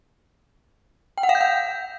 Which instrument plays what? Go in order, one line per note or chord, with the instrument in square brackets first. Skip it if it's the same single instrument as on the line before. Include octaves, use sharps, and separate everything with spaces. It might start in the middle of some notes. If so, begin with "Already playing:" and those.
[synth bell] G5
F#5
F5
G6
F#5